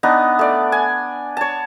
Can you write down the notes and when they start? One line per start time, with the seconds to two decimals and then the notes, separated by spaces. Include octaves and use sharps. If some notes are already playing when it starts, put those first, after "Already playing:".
0.03 B3 D4 D#4
0.39 A3 D5
0.72 G#5
1.37 C#5 A5